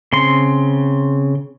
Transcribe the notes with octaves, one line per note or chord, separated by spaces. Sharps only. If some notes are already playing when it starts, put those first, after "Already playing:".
C#3 C4 C6